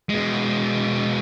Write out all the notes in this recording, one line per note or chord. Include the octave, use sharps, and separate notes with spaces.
B2 G#3